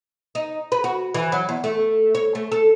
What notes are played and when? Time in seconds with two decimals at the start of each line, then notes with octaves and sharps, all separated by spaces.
0.35 D#4
0.72 B4
0.84 F#4
1.14 E3
1.32 F#3
1.49 E2
1.64 A3
2.15 C#5
2.35 A3
2.52 A4